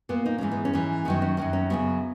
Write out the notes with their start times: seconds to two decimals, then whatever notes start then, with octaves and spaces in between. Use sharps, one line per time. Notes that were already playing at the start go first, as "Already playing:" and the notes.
0.09 A#2 A#3 B3
0.26 D#4
0.38 G#2 E3 G#3 C#4
0.51 B3
0.65 C#4
0.73 G#2 E3 G#3
1.05 F#2 D#3 F#3 B3
1.22 C#4
1.37 F#2 D#3 F#3 C#4
1.53 C#4
1.70 F#2 C#3 F#3 B3